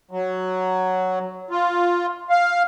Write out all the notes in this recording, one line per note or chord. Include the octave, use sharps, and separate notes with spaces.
F#3
F4
F5